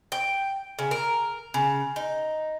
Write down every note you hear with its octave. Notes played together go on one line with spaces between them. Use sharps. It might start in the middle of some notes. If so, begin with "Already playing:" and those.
G5
C#3
A#4
C#3
D#4